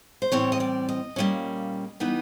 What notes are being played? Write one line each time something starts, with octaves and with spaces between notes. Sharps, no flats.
C5
A2 E3 G3 C4 C#5
D#5
D5
D#5
A#2 G3 A#3 C#4
E3 G3 B3 D#4